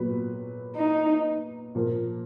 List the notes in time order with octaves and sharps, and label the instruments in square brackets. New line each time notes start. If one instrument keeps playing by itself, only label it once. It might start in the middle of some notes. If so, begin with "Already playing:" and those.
Already playing: [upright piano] A#2 F#3 B3 F#4 B4
[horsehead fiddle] D#4
[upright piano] A#2 F3 A#3